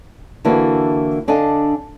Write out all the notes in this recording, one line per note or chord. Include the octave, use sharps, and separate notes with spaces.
D3 E3 A#3 D4 E4 F#4
D3 D4 A4 D#5 F5 G#5